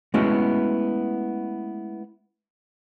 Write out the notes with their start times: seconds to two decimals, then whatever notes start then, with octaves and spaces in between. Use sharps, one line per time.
0.14 G#3 A3 B3 C#4 E4 F#4